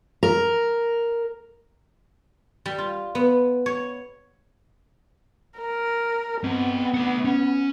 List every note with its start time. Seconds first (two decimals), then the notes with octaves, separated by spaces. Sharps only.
0.23 A#4
2.66 G3
2.78 F4
3.15 B3
3.66 C#5
5.59 A#4
6.44 B3 C4 D#5
6.94 A3 F#5
7.25 C#4